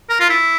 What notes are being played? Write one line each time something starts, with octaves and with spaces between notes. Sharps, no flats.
A#4
F4
E4